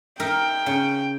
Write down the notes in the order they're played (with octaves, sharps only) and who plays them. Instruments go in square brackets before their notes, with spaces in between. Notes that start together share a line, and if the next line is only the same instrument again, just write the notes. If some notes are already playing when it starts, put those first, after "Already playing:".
[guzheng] D#4 A#4 E5 [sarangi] G5
[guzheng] C#3